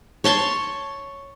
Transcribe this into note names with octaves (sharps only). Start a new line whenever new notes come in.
C#5 A5 C6 C#6